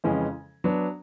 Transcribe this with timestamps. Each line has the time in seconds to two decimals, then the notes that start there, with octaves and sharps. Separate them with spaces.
0.04 F2 C#3 E3 G#3 C#4
0.64 F#3 B3 D4